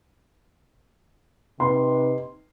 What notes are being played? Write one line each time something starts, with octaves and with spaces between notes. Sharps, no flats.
C3 D#4 B4 C6